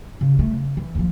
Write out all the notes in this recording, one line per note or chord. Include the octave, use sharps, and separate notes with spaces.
C#3
G3 A3
C#3
E3
D#2 F3